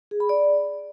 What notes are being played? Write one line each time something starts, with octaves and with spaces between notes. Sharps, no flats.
G#4
B5
D5